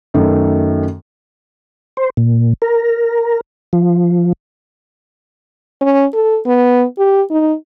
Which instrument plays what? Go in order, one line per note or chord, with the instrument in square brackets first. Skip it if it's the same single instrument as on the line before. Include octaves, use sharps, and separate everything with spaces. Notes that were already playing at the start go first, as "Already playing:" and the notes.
[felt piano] F#2 D#3 A3
[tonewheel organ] C5
A#2
A#4
F3
[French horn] C#4
A4
B3
G4
D#4